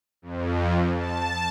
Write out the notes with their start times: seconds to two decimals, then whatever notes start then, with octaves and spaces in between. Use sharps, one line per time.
0.22 F2
0.97 A5